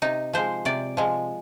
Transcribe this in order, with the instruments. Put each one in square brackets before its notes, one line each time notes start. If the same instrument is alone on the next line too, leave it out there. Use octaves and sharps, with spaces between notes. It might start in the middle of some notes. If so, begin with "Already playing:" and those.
[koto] C3 D#4
F3 G#3 C5
C3 D5
F3 G#3